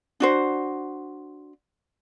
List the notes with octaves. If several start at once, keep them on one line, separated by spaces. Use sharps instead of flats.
D4 F#4 C5